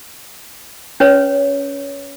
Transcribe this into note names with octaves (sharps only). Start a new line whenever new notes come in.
C#4 B4 C#5